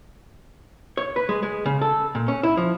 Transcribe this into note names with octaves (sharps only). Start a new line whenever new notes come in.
C#5
B4
G#3
G#3
C#3
A4
A#2
C#4
E4
F3